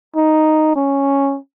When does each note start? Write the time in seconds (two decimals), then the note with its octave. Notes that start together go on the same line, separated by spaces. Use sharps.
0.16 D#4
0.76 C#4